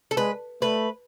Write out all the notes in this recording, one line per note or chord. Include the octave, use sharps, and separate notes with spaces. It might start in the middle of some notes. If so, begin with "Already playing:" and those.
A4
G#3 B4
A3 B4